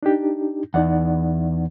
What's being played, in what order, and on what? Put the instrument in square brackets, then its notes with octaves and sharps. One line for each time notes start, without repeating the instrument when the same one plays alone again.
[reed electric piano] D4 D#4 G4
[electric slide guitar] E2 [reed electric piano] D#4 D5 F#5